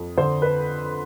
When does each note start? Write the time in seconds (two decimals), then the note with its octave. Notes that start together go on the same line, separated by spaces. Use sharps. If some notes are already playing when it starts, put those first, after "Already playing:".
Already playing: F2
0.17 D3 C5
0.42 B4